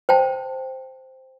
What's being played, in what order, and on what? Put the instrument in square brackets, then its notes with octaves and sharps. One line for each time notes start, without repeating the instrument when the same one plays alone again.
[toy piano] C5 G5 A5